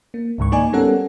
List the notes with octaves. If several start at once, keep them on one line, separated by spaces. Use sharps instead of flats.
A#3
C#2 G#2 D#3 C#6
A#3 D#4 D5 G#5
G3 B3 C#4 A4 A#4 F#5